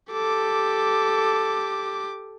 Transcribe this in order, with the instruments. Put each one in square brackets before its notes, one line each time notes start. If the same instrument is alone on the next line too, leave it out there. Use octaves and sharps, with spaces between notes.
[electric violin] G4 D6 [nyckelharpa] A4